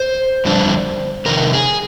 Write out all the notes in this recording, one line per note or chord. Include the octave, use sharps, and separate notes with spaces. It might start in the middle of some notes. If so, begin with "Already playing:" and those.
Already playing: C5
F2 D3 G3 D4
F2 C3 D#3 A#4
G#4